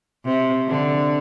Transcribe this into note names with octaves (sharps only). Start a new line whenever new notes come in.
C3
D3